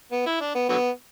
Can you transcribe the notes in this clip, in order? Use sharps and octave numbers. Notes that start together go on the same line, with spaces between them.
B3
E4
D4
B3
D3 F#3 B3